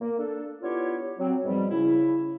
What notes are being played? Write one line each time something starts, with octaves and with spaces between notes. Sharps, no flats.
A#3
D4 A4
B3 D4 E4 F4 G4 C#5
F#3 C4
G#2 B2 F3 G3
C#3 E4